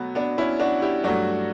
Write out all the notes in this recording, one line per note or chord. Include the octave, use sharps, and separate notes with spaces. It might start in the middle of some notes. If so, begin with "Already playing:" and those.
Already playing: B2 F#3 A3 B3
B3 D4
C#4 E4
D4 F#4
E4 G4
G2 F#3 A3 D4 F#4